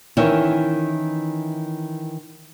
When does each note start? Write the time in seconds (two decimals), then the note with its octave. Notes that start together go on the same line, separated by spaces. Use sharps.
0.17 D#3 E3 C#4 E4